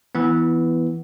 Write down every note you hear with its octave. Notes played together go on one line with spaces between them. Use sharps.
E3 B3